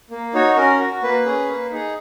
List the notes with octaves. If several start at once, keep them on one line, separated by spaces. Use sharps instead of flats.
A#3
D#4 F#4 C#5
C#4 A#4
F#4
A#3 B4
C#4 G#4
A#3
D#4 G#4